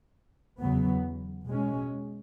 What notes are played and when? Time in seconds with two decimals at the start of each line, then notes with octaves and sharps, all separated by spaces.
0.59 E2 C#3 F#3 B3
1.47 B2 G#3 C#4